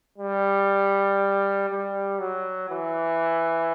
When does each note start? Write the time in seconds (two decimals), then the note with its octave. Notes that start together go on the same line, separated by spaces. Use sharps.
0.18 G3
1.70 G3
2.19 F#3
2.70 E3